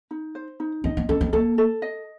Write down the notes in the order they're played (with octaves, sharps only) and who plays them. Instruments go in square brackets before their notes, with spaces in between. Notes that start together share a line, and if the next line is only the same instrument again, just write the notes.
[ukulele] D#4
C5
D#4
[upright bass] C4 [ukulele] D#5
[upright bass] C4
[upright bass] C#4 [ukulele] A4
[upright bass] C4
[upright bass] A#3 [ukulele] A4
[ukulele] A4
D#5